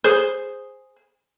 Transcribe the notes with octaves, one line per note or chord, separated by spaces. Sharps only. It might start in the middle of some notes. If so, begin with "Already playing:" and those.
G#4 C5